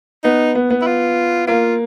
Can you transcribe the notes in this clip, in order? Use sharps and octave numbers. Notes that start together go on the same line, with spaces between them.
B3 D#4
B3
B3
E4
F4
A#3 F4